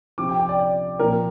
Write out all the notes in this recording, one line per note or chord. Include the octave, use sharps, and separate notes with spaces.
C3 F3 C4 D6
G5
G5
D5
D5
A#2 F3 C4 A#4